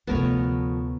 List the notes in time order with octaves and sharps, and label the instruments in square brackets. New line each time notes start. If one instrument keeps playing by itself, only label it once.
[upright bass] D2 C3 [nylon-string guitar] F3 A3 B4 [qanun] B3 A#4 C#5